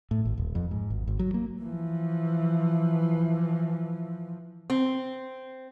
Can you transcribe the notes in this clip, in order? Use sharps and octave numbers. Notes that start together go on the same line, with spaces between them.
A2
G#1
D#1
F2
G#2
G#1
G#1
F#3
A#3
E3 F3
C4